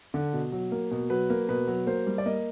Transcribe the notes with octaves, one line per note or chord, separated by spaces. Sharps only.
D3
B2
F#3
A#3
B2
F#3 B4
A#3
B2 B4
F#3
A#3 C5
G3
D5
A#3 D#5